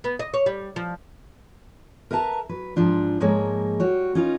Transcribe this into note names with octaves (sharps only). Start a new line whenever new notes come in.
B3
D#5
C#5
G3
F3
A#4 B4 E5 F#5 A5 A#5
F#3 B4
G#2 F3 D4 F4
G#2 F3 G#3 A#3 C#5
G3 F#4 C#5
C#4 D#4 F4 A#4 D#5